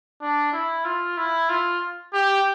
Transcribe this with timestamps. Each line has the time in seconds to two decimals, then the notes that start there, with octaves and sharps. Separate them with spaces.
0.21 D4
0.53 E4
0.85 F4
1.18 E4
1.50 F4
2.14 G4